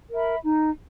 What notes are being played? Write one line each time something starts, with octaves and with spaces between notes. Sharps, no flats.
A#4 E5 B5
D#4